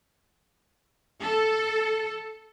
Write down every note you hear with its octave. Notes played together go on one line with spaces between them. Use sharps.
A4